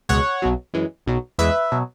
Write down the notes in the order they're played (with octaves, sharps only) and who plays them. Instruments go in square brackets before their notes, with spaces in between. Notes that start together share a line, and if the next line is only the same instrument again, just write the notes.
[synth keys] C#2 B2 G#3 C#5 F#5
B1 B2 F#3
F#2 E3 G#3
B1 B2 F#3
E2 E3 G#3 B4 E5
B2 F#3